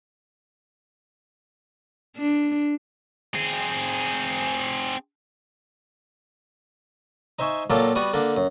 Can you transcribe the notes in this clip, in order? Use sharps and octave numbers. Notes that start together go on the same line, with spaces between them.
D4
C4 G#4
D#4 C5 E5 G#5 C#6
A#2 F#3 A#3 F4 G4 A4
G3 B3 F#4 D#6
D3 A#3 D4
F#2